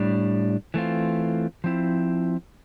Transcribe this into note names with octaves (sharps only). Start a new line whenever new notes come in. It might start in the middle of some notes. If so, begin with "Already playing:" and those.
Already playing: A2 G3 D4
E3 A3 C4 F4
F3 C4 E4